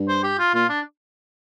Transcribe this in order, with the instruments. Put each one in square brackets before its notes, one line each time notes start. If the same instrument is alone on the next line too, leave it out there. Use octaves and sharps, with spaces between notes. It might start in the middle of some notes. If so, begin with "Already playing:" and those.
Already playing: [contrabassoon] G2
[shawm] C5
G4
F4
[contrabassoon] A#2 [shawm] F4
[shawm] D4